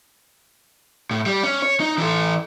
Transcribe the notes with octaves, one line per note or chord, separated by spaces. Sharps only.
A2
G3
C#4
C#5
D#4
E3 A4